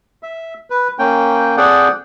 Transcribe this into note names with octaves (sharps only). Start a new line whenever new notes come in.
E5
B4
A#3 C#4 G5
C4 G#4 A4 D5 F#5 G5